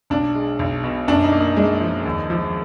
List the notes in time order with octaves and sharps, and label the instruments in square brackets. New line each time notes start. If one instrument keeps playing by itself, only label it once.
[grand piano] B1 [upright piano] D4
[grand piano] G#3
B1
B2
[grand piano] F#2 [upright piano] D4
[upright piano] D#4
[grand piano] A#3
[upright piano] D#4
[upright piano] G#3 [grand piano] D4
[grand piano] F3
D#2
F3